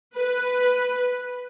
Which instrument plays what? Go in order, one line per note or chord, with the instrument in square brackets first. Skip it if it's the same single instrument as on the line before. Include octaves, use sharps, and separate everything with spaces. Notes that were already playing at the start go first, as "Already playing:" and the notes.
[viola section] B4